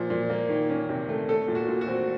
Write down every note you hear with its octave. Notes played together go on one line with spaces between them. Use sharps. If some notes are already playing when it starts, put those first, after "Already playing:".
Already playing: A#2 F3
A#2
A#3
D#3
C#4
C3
A3
A3 A4
A#2
F#4
A#2
F#4
C4